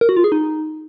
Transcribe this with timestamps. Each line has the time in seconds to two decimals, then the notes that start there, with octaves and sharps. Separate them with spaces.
0.01 A#4
0.09 F#4
0.17 F4
0.24 G#4
0.32 D#4